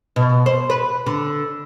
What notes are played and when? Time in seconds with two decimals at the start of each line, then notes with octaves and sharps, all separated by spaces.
0.16 B2
0.46 C5
0.70 B4
1.06 D3